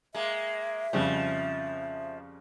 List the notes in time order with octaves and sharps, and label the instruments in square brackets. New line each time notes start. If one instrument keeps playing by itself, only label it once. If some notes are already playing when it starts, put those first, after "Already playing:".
[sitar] G#3 A#3 [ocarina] E5
[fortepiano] F2 C#3 G3 [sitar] F3